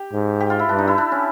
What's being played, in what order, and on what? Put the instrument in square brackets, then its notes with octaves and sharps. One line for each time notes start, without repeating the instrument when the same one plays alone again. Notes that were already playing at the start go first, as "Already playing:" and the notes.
Already playing: [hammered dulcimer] G4
[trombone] G#2
[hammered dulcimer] G4
F4
E4
[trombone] G2 [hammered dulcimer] D4
[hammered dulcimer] D#4
E4
D4
C#4